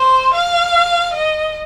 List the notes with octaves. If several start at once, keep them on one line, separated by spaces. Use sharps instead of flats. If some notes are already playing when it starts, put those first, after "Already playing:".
Already playing: C5
F5
D#5